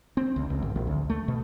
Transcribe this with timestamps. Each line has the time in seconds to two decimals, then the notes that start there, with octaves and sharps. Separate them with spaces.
0.17 C4
0.36 C#2
0.50 C#2
0.62 G#1
0.76 A#1
0.87 D2
1.10 A3
1.28 B2